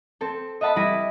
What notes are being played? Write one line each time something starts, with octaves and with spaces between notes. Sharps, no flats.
C4 A4
D#5 E5 F#5 A5 B5
G3 E4 B5 A#6 D#7